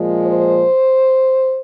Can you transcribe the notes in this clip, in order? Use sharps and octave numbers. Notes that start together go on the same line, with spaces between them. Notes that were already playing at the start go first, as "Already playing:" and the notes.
Already playing: A#2 F3 G#3
C5